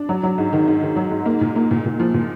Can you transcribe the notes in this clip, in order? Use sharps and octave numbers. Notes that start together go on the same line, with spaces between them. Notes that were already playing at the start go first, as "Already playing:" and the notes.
Already playing: D4
F#3
F#3
G#2
D#3
G#2
D#3
F#3
G#2
A#3
A#2
A#3
A#2
A#2
F3
A#2